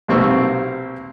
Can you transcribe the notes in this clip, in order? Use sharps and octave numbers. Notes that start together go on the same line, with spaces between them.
B1 C3 A#3 C4 C#6 E6